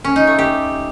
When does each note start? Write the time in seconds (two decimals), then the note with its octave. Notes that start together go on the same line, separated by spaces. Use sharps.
0.04 C#4
0.16 D#4
0.27 A3
0.39 G4